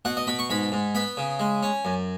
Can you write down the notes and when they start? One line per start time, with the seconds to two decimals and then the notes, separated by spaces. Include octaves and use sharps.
0.05 B2 F#5
0.17 D#5
0.27 B2 B5
0.39 C#6
0.50 G#2 B5
0.72 G#2
0.95 B3 B5
1.17 C#3
1.39 G#3
1.63 C#4
1.85 F#2